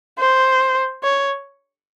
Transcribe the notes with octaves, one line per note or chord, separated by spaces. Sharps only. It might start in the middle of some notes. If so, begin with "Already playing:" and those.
C5
C#5